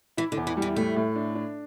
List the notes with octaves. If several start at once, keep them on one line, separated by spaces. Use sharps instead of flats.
E3 E4
D3
E2
E3
G3
E3
A2 A3
A2
D4
D4